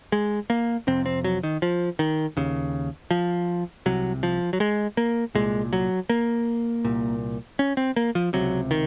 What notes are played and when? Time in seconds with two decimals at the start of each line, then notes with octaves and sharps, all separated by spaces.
0.12 G#3
0.50 A#3
0.87 F2 C3 C4
1.06 C4
1.24 F#3
1.43 D#3
1.62 F3
1.99 D#3
2.37 D#2 C#3
3.11 F3
3.86 C2 C3 F#3
4.23 F3
4.53 F#3
4.60 G#3
4.97 A#3
5.35 C2 A#2 G#3
5.73 F#3
6.10 A#3
6.85 C2 A#2
7.59 C#4
7.77 C4
7.96 A#3
8.15 F3
8.33 C#2 C3 F#3
8.71 D#3